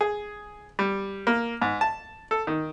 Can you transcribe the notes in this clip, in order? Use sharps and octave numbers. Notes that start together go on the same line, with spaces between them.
G#4
G3
A#3
G#2
A5
A4
D#3